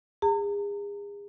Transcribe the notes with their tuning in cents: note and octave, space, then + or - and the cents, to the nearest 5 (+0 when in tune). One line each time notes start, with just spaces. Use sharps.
G#4 -35 A#5 -45